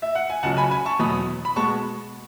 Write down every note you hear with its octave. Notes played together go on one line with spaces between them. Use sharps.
E5
F#5
G#5
C#2 C#3 F#3 F#5 A5
G#5 B5
G#5 B5
A5 C#6
E2 B2 F#3 B3 B5 D#6
B5
B2 G#3 B3 A5 C#6